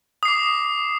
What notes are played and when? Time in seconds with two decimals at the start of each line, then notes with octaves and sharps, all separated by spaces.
0.23 D#6
0.25 C7
0.28 D6